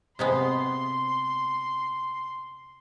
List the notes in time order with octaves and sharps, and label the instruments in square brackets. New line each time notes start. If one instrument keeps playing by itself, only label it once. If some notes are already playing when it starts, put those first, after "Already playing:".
[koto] C3 G#3 B3 [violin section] C6